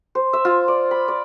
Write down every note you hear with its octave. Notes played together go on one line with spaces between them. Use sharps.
C5
E5
F4
D5
B5
D5